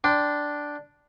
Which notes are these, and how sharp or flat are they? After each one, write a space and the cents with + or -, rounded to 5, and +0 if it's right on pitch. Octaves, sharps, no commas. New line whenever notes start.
D4 +0 G5 +0 C6 -35